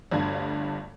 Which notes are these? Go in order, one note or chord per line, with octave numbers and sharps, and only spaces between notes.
G1 D2 G2 G#6